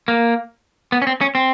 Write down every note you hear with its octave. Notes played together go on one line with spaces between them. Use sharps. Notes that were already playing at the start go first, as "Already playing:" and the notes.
A#3
B3
C#4
C4
C#4
C4